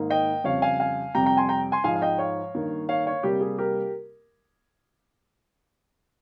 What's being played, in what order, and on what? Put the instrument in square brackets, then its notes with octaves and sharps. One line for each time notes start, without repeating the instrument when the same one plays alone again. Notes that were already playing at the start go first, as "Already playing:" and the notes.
Already playing: [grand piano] G#2 D#3 A#3
D#5 G5
F2 C#3 G3 C#5 F5
F5 G#5
F5 G#5
F2 C3 G3 G5 A#5
G5 A#5
G#5 C6
G5 A#5
G#5 C6
G#2 F3 G#3 F5 G#5
F5
D#5 G5
C#5 F5
G2 D#3 A#3
C#5 F5
C#5 F5
C3 G3 A#3 G4
G#4
G4 A#4